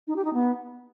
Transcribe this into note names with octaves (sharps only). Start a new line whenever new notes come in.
D#4
G4
D#4
B3